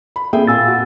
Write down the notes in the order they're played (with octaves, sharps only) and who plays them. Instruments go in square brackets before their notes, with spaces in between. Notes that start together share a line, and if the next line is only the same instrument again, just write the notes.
[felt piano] B5
[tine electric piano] A#3 C4 [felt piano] G#4 E5 G5
[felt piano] A#2 G#5 [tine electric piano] E6 A6
[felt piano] F#4